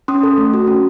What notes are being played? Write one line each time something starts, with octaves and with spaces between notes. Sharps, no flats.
C#4 C6 D#6
A4
A3
F#4
C#4